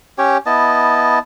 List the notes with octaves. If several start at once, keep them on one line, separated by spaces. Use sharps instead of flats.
C#4 G4 C#5
B3 E4 D#5 A5